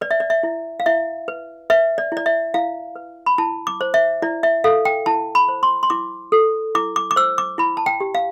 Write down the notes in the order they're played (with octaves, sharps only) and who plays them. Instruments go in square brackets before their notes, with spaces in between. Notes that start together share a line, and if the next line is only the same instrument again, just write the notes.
[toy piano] B4 D5
E5
D5
E5
E4
F5
E4 E5
B4
B4 E5
D5
E4
D5
E5
E4 F5
B4
B5
E4 A5
D6
C5
E5
E4 D5
E5
A4 F5
G5
E4 A5
B5
C5
C6
C6
E4 D6
A4
E4 D6
D6
D6
C5 E6
D6
E4 B5
A5
G5
G4
F5